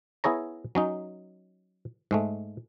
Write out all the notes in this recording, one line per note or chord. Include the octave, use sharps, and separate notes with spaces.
B3 E4 G#4 C#5 A#5
F#3 C#4 D#4
G#2 G#3 A3